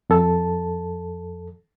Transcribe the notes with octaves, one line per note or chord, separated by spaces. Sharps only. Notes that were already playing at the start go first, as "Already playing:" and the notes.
F2 A4 A5